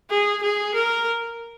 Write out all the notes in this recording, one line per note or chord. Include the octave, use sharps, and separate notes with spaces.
G#4
G#4
A#4